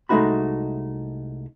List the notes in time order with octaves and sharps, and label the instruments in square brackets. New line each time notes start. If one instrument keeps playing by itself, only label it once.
[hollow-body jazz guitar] C2 G#3 A3 D#4 F#4 B5